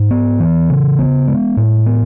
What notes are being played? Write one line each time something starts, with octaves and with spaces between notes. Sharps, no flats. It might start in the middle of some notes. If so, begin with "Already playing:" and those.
Already playing: G#2
B3
E3
C#3
B3
G#3
A2
B3